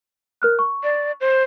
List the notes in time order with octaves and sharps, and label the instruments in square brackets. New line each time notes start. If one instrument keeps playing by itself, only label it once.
[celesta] A#4 F6 F#6
C#6
[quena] D5
C5